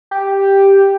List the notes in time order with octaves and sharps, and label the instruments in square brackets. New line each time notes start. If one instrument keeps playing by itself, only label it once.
[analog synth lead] G4